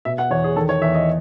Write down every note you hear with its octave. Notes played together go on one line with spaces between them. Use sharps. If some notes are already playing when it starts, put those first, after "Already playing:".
B2 E5
F#5
E2 C#5
G#4
D#3 A4
C#5
E2 E5
D#5